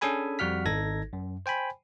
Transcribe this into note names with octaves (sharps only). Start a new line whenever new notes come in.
C#4 D4 G#4 A4 G#5 B5
F2 G3 F#4 F#5 F6 B6
G#1 D#4 A4 G#6 A#6
F#2
C5 G5 G#5 B5